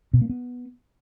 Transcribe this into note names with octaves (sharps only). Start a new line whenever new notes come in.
B2
A#3
B3